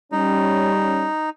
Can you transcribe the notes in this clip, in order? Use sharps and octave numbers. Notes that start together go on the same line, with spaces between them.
G3 C#4 D#4